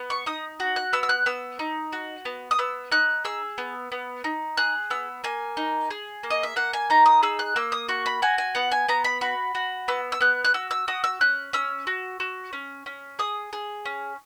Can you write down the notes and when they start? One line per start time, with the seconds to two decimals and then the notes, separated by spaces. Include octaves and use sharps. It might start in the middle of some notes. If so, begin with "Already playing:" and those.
Already playing: B3
0.10 C#6
0.26 D#4 D#6
0.60 F#4
0.76 F#6
0.93 B3 E6
1.03 E6
1.09 F#6
1.26 B3 E6
1.59 D#4
1.93 F#4
2.25 B3
2.51 D#6
2.59 B3 E6
2.92 D#4 F#6
3.25 G#4 E6
3.58 B3
3.92 B3
4.24 D#4
4.57 G#4 F#6
4.90 B3 E6
5.24 A#3 G#5
5.57 D#4
5.91 G#4
6.23 A#3
6.30 D#5
6.43 E5
6.56 A#3 F#5
6.73 G#5
6.90 D#4 A#5
7.06 D#6
7.23 G#4 E6
7.39 F#6
7.56 A#3 E6
7.72 D#6
7.89 F#4 C#6
8.06 B5
8.22 F#4 G#5
8.38 G#5
8.55 B3 F#5
8.72 G#5
8.88 B3 A#5
9.04 B5
9.21 F#4 B5
9.55 F#4
9.88 B3 E6
10.12 E6
10.21 B3 F#6
10.45 F#6
10.54 F#4 E6
10.71 E6
10.88 F#4 D#6
11.04 E6
11.21 C#4 F#6
11.53 C#4 E6
11.87 F#4
12.20 F#4
12.53 C#4
12.86 C#4
13.19 G#4 D#6
13.53 G#4
13.86 C#4